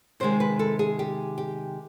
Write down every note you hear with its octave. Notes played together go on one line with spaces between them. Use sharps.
C3 D#3 G#3 C5
B4
A4
G#4
G4
G4